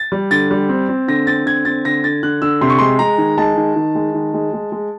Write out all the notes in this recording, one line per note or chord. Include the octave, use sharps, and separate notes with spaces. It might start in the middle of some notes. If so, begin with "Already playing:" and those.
Already playing: A6
G3
D3 A6
G3
C4
C4
D3 A#6
C4 A6
D3 G#6
C4 A6
D3 A#6
D3 A6
D3 F#6
D3 E6
C3 C6
C#6
G#3 C6
G#3 A#5
D#3
G#3 A5
D#3
D#3
G#3
D#3
G#3
G#3
G#3